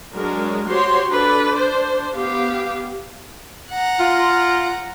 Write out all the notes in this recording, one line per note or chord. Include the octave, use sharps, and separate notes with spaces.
F#3 G#3 D4 A#4
F#4 G4 C5 C#5 C6
D4 A4 B4 D5
D4 C5
B3 G4 F5
F#5 A#5
F4